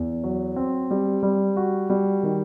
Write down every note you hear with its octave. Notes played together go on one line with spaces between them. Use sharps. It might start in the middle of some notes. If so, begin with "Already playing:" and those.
Already playing: E2
F#3
C4
G3
G3
F#4
G3
D#3